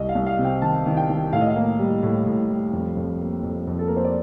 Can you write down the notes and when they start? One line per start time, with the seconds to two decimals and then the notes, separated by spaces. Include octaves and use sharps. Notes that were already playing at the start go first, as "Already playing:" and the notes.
Already playing: C2 D#5
0.09 F5
0.15 C2
0.26 F5
0.39 C3
0.44 G5
0.62 D#3 A5
0.86 D#3
0.97 G5
1.09 D#3
1.33 A2 F5
1.41 D#5
1.50 F5
1.56 A#3
1.79 G3
2.03 A2
2.26 A2
2.50 G3
2.73 F2
2.97 F2
3.20 A#3
3.43 F2
3.67 F2
3.79 A4
3.88 A#3 A#4
3.97 C5
4.04 D5